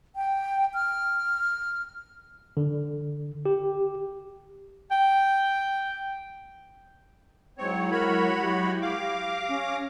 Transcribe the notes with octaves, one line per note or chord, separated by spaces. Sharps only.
G5
F6
D3
G4
G5
G#2 F#3 G#3 C4 E4 C#5
F#4 A#4 C#5 B5
G4
F5 D6 A#6
C#4